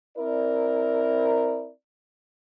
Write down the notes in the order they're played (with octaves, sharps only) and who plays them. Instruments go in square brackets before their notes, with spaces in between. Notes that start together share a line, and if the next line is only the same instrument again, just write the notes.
[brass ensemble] C4 E4 A#4 D5